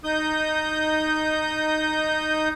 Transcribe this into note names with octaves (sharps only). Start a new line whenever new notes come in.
D#4 D#6 G6